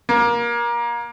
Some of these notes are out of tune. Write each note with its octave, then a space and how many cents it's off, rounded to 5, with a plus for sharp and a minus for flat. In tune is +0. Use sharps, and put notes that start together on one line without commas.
A#3 +25